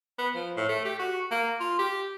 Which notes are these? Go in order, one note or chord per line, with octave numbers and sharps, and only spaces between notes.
B3
F3
A2
A3
G4
F#4
A#3
F4
G4